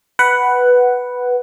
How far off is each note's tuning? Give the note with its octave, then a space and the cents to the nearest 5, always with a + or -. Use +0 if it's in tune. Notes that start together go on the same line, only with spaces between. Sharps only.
B4 +0 F#5 +10